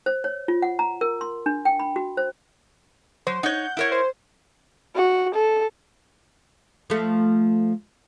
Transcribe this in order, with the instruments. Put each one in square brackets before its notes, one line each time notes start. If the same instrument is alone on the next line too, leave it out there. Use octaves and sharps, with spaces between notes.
[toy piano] C5
C#5
F4
F#5
A#5
A#4
C6
D4
G5
B5
F#4
C5
[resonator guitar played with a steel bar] F#3 [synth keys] C5
[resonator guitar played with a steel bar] D#4 C#5 [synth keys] F#5 G6
[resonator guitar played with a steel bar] E4 A#4 C#5
[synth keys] C5
[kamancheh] F#4
A4
[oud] F3 A3